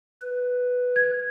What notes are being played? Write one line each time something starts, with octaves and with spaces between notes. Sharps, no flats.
B4
G#6